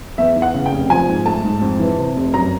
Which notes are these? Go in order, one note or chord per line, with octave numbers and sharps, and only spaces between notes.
E2 E5
E3
F#5
C#3
G5
F1
F3 G#5
G#2
A3 A5
G#2
F2
E3
C3
F1
F#2 A#5